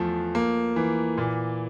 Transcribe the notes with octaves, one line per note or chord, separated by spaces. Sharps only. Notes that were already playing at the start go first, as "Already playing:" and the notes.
Already playing: E2 F3 A3
A#3
E3
A#2